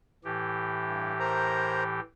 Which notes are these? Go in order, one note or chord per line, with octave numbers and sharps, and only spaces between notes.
A2 E3 G4
G2
A#4 C5 A#5